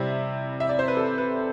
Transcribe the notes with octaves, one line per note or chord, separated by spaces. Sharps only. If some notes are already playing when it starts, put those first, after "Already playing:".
Already playing: C3 G3 C4 E4
E5
D5
C5
B4
A4
B4